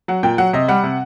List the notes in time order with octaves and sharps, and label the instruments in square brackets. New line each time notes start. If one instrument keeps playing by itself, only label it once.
[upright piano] F#3 F#5
A#2 G5
F#3 F#5
C3 D#5
G3 F#5
C3